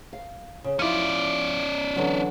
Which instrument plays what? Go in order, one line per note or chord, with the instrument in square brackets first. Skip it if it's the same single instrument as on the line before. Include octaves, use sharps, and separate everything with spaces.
[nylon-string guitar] F5
C#3
[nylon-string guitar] F3 D#4 E4 [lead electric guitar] C#4 D5
[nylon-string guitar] D3 E3 F#3